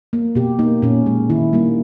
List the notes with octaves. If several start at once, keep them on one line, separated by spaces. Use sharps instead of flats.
A#3
B2 G4
A#3 D#4
A#2 C#4
G#3
D#3 E4
G3 A#3